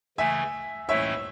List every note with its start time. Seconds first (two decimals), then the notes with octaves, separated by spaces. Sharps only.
0.18 C#3 E3 A3 E5 G#5
0.88 A2 E3 A3 C#4 E4 C#5 E5